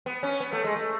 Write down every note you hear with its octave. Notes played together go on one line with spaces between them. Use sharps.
B3
C#4
B3
A3
G#3
A3